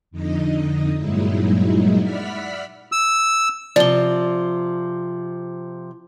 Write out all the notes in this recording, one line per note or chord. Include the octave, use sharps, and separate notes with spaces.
F2 D3 D#4 D#5
G2 A#2 F#3 G#3 D#4 E4
D5 E5 F#5 B5 F6 B6
E6
C3 F3 D5 G7